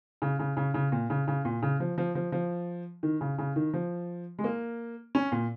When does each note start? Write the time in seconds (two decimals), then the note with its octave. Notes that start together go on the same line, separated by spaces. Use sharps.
0.22 C#3
0.39 C#3
0.57 C#3
0.74 C#3
0.92 A#2
1.10 C#3
1.28 C#3
1.45 A#2
1.62 C#3
1.80 F3
1.98 F3
2.15 F3
2.32 F3
3.03 D#3
3.21 C#3
3.38 C#3
3.56 D#3
3.74 F3
4.39 G#3
4.44 A#3
5.15 C#4
5.32 A#2